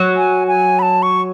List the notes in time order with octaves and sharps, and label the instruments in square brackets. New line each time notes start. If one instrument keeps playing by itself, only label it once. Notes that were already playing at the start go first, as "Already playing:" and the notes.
Already playing: [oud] F#3
[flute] G#5
G#5
B5
A5
C#6